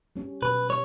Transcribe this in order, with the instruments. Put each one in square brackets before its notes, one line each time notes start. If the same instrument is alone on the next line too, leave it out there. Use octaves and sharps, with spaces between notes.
[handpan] G3 C#4 G4
[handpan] B2 [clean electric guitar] B4
[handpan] G3 [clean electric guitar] C#5